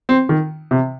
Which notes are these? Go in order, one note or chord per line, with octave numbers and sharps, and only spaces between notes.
C4
D#3
C3